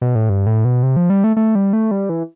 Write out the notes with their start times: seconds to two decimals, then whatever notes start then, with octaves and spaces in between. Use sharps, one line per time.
0.02 B2
0.15 A2
0.29 G2
0.47 A2
0.65 B2
0.83 C3
0.96 F3
1.10 G3
1.24 A3
1.37 A3
1.55 G3
1.73 A3
1.91 G3
2.09 E3